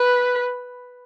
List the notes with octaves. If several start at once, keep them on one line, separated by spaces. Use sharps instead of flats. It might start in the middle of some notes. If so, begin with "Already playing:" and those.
Already playing: B4